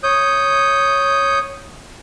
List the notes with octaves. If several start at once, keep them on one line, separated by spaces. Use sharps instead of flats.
C#5 D#6 G6